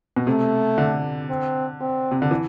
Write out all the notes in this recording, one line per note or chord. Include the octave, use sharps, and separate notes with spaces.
B2
C3 A3
D3
C4
C4
C3
D3
E3